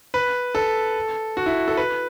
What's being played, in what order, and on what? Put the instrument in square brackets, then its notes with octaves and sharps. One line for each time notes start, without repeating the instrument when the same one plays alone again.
[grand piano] B4
A4
F#4
E4
A4
B4